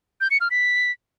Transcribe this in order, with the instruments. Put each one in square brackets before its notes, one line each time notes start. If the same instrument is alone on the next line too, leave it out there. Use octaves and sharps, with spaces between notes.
[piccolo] G6
C#7
F6
B6